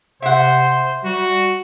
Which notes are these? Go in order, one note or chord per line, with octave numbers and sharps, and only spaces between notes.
C3 C5 E5 F#5
G3 F#4